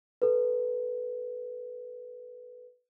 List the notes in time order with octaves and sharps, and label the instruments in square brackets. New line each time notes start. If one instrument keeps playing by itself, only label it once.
[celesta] A4 B4